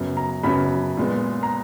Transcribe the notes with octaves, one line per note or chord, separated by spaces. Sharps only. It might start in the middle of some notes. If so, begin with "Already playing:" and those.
Already playing: F#2 C#3 F#3 B3
A#5
F#2 C#3 F#3 B3 B5
A#2 G#3 B3
A#5